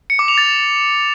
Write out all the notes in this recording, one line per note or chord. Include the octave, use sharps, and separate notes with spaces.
C#7
D6
F7
A6